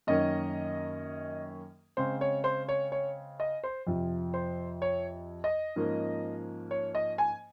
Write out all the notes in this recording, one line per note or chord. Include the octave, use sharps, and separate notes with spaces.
F#2 D#3 A#3 C#4 D#5
C#3 G#3 C4 C5
C#5
C5
C#5
C#5
D#5
C5
F2 C3 F3
C5
C#5
D#5
G#2 F3 A#3 C#4
C#5
D#5
G#5